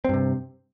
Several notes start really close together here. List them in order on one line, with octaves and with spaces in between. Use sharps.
C4 G2 C3